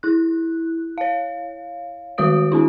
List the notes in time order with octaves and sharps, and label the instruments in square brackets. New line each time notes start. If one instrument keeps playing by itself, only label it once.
[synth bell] E4 F#6
C#5 F5
D#3 G#3 F#4 C#5 D#6 D7
C4 D4 E4